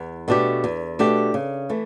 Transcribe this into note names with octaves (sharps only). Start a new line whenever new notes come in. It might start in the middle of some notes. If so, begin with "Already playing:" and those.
Already playing: E2
B2 A3 D4 G4
E2
B2 A3 D4 G4
C#3
E3 A3